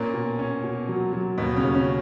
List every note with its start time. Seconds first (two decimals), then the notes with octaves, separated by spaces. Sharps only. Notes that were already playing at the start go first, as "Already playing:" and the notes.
Already playing: A#2 A#3 C#4
0.14 B2
0.39 C#4
0.64 B2
0.89 F#3
1.13 F#3
1.37 D#2 B2 B3
1.56 C#3 C#4
1.63 D#2
1.75 C#3 C#4